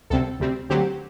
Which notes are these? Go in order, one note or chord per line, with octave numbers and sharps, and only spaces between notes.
D2 C3 G3 C4 A4
D2 C3 G3 C4
D2 D3 F#3 C4 G4